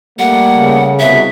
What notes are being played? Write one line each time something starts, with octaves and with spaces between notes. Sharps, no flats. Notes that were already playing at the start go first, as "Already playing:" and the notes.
G3 A3 A#3 F#5
C#3
C2 B2 E5